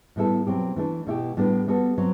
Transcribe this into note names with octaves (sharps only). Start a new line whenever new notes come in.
A2 G3 B3 E4 A4
B2 F#3 C4 G4
E3 A3 D4
B2 A3 E4 G4
A2 G3 B3 D4
G3 B3 F#4 A4
F#3 C4